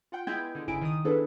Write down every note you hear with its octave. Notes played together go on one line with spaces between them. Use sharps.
F4 F#5 G5
G#3 B3 E4 G5 G6 G#6
D3 G#3
G1 C#3 G#3 E4 G#5 D7
D#3 D#6
B3 D4 E4 G#4 A4 B4